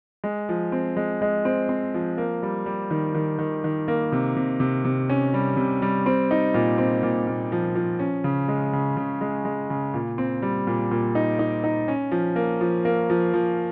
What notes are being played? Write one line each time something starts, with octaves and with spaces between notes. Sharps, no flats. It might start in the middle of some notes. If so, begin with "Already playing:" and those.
G#3
F3
C4
G#3
G#3
C4
C4
F3
A#3
G3
G3
D#3
D#3
D#3
D#3
A#3
C3
C3
C3
C3
C#4
G3
C3
G3
C4
D#4
A#2
C4
A#2
A#2
F3
F3
C#4
C#3
G#3
C#3
C#3
G#3
G#3
C#3
A#2
C4
G3
A#2
A#2
D#4
D#4
D#4
C#4
F3
A#3
F3
A#3
F3
F3